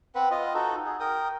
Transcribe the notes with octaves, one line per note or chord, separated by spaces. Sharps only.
C4 B4 F#5
F4 D#5
D#4 F#4 A4
G#4
A#4 G5 D#6